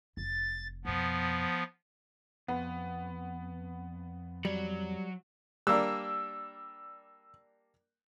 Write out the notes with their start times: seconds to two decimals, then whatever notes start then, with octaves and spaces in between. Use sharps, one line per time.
0.17 F1 A6
0.85 F2 B2 F3 B3
2.48 F2 B3
4.45 F#3 G3
5.67 G3 A#3 D4 E6